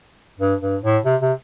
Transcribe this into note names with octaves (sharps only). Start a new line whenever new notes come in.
G2
G2
A2
C3
C3